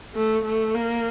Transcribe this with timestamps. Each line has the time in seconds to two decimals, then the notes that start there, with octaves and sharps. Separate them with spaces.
0.15 A3
0.45 A3
0.74 A#3